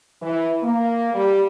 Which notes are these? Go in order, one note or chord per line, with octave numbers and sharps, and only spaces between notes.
E3
A#3
G3